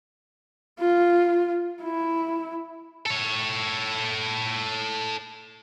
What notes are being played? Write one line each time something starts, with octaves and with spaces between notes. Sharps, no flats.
F4
E4
A4 C#5